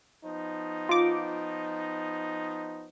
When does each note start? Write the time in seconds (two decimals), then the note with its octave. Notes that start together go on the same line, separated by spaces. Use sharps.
0.24 F3 B3 D#4
0.89 F4 D6